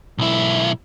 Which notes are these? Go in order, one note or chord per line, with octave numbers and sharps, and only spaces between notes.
B1 E4